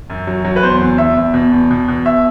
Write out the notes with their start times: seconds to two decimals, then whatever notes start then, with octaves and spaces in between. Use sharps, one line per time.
0.10 F#2
0.27 F#3
0.45 F#3
0.56 B4
0.63 E2 C5
0.81 E2
0.98 E2 E5
1.17 E2
1.34 B2
1.52 E2
1.71 B2
1.88 B2
2.06 E5